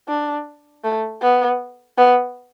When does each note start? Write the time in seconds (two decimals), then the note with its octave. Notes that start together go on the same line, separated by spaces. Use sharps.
0.08 D4
0.84 A3
1.22 B3
1.98 B3